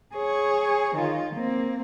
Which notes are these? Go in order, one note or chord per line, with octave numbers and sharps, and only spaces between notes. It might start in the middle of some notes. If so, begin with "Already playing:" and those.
G#4 C#5
D#3 F4
A#3 C4